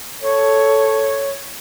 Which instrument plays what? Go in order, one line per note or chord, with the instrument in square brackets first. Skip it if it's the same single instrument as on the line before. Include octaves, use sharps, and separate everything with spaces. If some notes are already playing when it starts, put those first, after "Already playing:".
[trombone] A4 [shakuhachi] C#5